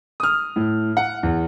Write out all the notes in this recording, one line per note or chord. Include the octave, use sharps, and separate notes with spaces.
D#6 F6
A2
F#5
E2